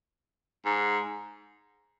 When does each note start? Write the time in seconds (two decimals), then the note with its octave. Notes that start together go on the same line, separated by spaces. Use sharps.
0.65 G#2